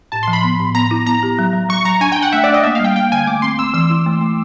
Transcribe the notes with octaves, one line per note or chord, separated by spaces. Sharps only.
A2 A5
C6
F3
B5
B3
A2
B3 A#5
E4
B3 A#5
G4
F#3
F#3
F#3 C#6
F#3 A#5
D4 G#5
D4 G5
F#5
A3 E5
D5
D4
D#5
A#3 E5
G3 F5
G5
A#3 G5
D3 G#5
A3 D6
C4 C6
C4 E6
E3 E6
E4
A3
A3